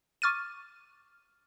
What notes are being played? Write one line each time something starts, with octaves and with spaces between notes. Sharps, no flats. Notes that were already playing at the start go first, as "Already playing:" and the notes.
C#6 D6 F6 A6 D#7